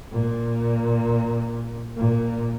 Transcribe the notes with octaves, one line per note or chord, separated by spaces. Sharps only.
A#2
A#2